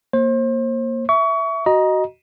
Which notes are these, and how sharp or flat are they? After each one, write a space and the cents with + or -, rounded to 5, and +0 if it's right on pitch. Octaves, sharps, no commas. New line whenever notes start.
A#3 +0 C5 +35
E5 +0 C#6 +30
F#4 +15 D#5 +0 A#5 +25